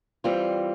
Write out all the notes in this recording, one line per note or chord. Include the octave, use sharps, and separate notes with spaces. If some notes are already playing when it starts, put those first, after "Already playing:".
E3 G3 C4 F4